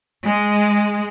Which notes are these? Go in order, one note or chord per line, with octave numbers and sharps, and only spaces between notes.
G#3